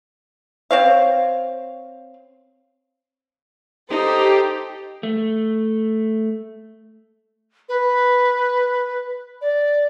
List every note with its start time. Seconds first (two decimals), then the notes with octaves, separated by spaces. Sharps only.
0.71 C4 C#5 F5
3.90 D#4 G4 A4 C5
5.03 A3
7.69 B4
9.41 D5